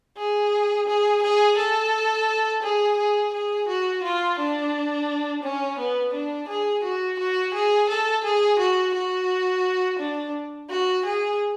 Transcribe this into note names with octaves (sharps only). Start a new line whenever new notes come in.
G#4
G#4
G#4
A4
G#4
G#4
G#4
F#4
F4
D4
C#4
B3
D4
G#4
F#4
F#4
G#4
A4
G#4
F#4
F#4
D4
F#4
G#4